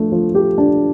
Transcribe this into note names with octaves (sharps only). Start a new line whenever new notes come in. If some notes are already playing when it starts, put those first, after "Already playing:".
Already playing: F3 A3 D4
F3
G4
D4